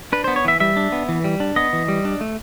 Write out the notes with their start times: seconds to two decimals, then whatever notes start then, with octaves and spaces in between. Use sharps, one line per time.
0.12 D4 B4
0.24 B3 C5
0.36 C#5
0.45 E3 E5
0.60 G3 E5
0.77 D4
0.92 B3
1.09 E3
1.24 G3
1.40 D4
1.56 B3 D#5
1.73 E3
1.88 G3
2.05 D4
2.21 A3